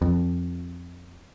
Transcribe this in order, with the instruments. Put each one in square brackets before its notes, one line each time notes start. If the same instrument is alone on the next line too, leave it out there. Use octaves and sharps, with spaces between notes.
[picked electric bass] F2